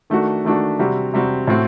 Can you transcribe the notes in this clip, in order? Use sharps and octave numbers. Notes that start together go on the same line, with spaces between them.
D#3 A3 D4 F#4
D#3 A3 D4 F#4
C3 G3 C4 F#4
C3 G3 C4 F#4
A2 A3 C4 F#4